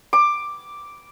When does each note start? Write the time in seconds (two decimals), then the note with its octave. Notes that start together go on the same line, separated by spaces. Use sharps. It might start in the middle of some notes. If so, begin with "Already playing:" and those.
0.13 D6